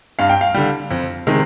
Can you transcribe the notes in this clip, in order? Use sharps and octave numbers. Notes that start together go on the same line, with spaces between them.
G2 F5
G5
F5
D3 G3
F2
C3 D#3 G#3